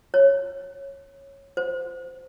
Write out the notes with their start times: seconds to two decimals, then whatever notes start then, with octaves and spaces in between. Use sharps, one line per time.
0.14 C#5
1.57 C5